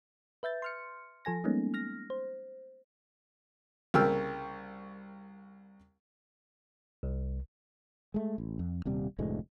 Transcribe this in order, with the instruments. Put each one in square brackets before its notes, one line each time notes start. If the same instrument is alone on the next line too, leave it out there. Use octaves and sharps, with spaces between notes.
[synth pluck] B4 E5 G6 A6
C6 F6 C#7
F3 A4 G#5 A#6
G3 G#3 A#3 B3 C#4 D#4
F6 A#6
C5
[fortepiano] C2 C#3 A#3 G5 E6 F6
[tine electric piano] C2
[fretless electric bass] G#3 A3
A1
F2
D#1 C3 G3
F1 D2 A2 G#3